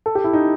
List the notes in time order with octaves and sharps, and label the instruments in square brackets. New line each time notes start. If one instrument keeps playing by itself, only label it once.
[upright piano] A4
G4
E4
D#4